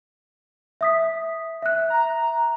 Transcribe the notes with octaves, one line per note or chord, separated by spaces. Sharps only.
E5 D#6 B6
E5 F#6
A#5